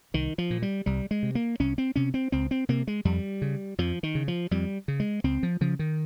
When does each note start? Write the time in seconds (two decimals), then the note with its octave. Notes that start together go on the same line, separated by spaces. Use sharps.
0.14 C2 D#3
0.38 F3
0.50 A#2
0.62 G3
0.86 C2 G3
1.11 G#3
1.23 C3
1.35 A#3
1.60 C2 C#4
1.78 C4
1.96 C3 C#4
2.14 C4
2.32 C#2 C4
2.51 C4
2.69 C3 A#3
2.87 G#3
3.05 F2 G3
3.42 C#3
3.78 F2 F3
4.03 D#3
4.15 C#3
4.28 F3
4.51 F2 G3
4.88 C#3
5.00 G#3
5.24 C#2 C4
5.43 F3
5.61 C#3 F3
5.79 D#3